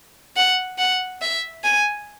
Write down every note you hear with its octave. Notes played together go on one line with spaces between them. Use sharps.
F#5
F#5
E5
G#5